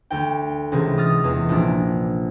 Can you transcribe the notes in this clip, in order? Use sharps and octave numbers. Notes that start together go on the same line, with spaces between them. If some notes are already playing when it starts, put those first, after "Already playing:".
D2 G5
C#2 C3 E3
D#6 F6 A6
E2
A#1 D4